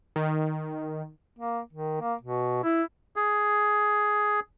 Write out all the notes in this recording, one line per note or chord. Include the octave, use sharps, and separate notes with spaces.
D#3
A#3
D#3
A#3
B2
E4
G#4